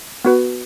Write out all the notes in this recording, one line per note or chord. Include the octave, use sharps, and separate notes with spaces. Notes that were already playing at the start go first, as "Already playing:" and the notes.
B3 F#4 B4